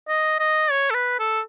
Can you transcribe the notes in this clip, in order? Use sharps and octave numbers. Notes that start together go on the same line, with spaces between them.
D#5
D#5
C#5
A4
B4
A4